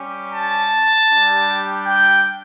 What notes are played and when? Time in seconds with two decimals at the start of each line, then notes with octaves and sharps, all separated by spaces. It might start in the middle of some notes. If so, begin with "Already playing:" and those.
Already playing: G3 C#4 G4
0.33 A5
1.09 G3 D4 G4
1.86 G5